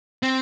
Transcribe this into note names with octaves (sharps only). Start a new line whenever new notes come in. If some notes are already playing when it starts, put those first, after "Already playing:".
C4